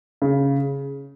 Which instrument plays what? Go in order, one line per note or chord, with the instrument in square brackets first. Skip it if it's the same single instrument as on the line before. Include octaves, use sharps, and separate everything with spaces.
[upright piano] C#3